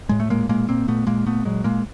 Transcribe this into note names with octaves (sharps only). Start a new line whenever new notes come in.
A2 G#3
A3
A#2 G#3 A#3
A#2 G#3 A#3
A#2 A#3 C4
A#2 A3 B3
A#2 G#3 A#3
A#2 A3 B3
A#2 F#3 G#3
A#2 G#3 A#3